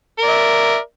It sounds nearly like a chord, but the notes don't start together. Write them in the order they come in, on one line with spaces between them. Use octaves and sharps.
A#4 D5 E5